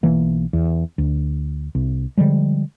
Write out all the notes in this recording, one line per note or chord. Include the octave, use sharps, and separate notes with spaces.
B1 E3 A#3
E2
D2
C2
D3 F3 G3 G#3